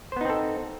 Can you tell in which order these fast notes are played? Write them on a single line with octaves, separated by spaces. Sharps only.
C5 B3 D#4 C4 A4